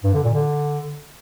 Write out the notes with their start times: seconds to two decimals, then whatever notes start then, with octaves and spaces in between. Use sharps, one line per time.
0.04 G2
0.14 D3
0.24 A#2
0.34 D3